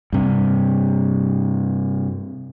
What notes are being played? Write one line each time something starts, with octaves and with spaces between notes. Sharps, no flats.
G2 C3